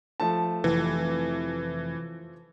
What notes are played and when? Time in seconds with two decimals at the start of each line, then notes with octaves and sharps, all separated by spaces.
0.20 F3 A3 A5
0.64 F1 E3